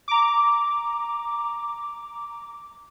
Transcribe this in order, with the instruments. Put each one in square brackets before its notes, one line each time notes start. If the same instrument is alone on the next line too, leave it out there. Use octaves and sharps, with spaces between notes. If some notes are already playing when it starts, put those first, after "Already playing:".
[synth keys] A#5 D6